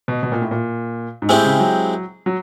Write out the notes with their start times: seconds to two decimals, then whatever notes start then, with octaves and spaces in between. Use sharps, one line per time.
0.08 B2
0.23 B2
0.32 A#2
0.42 A2
0.51 A#2
1.22 G#2
1.29 A2 G#3 C4 E4 G4
1.44 C#3
1.60 F#3
2.26 F#3